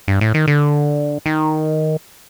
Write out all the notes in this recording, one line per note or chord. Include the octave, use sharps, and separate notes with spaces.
G2
A2
D#3
D3
D#3